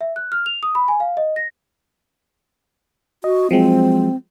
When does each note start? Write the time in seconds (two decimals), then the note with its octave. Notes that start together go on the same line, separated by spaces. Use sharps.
0.01 E5
0.16 F#6
0.32 F6
0.46 F7
0.63 D#6
0.75 B5
0.88 G#5
1.00 F5
1.17 D#5
1.36 A#6
3.24 F#4 D#5
3.51 F3 F#3 G#3 C4